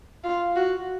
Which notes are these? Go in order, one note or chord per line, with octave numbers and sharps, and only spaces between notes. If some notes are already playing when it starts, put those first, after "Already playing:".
F4
F#4